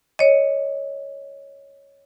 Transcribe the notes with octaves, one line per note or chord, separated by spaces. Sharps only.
C#5 D#5